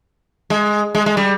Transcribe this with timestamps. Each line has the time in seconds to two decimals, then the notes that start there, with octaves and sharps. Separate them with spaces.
0.50 G#3
0.95 G#3
1.06 G#3
1.17 G3